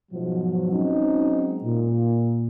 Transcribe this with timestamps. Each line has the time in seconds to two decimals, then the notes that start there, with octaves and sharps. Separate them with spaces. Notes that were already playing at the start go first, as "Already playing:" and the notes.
0.12 G#2 B2 F3 F#3
0.72 F#3 G#3 C4 C#4 D#4
1.63 A#2